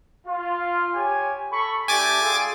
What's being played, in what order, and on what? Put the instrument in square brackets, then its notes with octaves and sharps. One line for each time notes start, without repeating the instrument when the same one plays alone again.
[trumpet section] F4
G4 C#5 G#5
A4 B5 C#6
[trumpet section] A3 D4 G4 [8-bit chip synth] G#5 D6 A6
[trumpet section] F4 G#4 A4